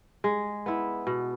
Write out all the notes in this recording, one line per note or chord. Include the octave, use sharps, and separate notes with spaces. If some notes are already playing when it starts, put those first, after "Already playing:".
G#3
B3 E4
B2